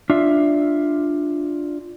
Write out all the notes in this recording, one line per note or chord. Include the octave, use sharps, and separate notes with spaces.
D4 F4 E5